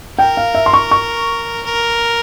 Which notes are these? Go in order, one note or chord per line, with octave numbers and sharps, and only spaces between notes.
A#4 G5
F5
E5
C6
C#6
C#6
A#4